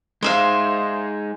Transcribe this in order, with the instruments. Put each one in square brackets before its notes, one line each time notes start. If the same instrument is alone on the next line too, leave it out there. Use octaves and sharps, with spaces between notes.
[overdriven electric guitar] G#3 D#4 [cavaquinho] C5 E5 F5